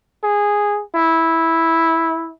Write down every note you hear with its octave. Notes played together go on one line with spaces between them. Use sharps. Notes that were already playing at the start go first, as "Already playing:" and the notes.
G#4
E4